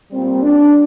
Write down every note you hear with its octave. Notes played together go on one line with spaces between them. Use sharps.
A#2 G3 C4
D4